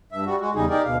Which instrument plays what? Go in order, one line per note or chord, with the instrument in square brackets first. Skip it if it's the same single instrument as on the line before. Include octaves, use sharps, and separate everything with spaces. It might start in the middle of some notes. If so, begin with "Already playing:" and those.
[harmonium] G2 E5
G3 F#4
G#3 F#4
E2 C#3 G3 D#4 G#4
D#4 G4 G#4 A#4 D5
D2 B2 F5